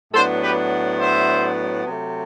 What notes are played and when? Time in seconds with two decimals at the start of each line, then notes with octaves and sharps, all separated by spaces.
0.13 A2 F#3 B3 D4 A4 C5
0.42 G4 B4
0.99 C5 E5
1.86 C3 F#3 A3